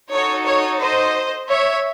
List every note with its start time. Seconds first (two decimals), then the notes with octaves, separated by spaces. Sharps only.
0.12 D#4 F#4 A4 C#5
0.47 C#5
0.82 C5 D#5
1.50 C#5 E5